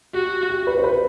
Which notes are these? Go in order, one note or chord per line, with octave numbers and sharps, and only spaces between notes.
F#4 G4
G4
B4
C5
B4